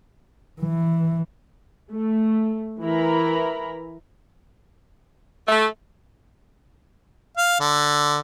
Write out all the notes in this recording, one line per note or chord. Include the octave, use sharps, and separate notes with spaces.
E3
A3
E3 E4 A#4 A#5 B5
A3
F5
D3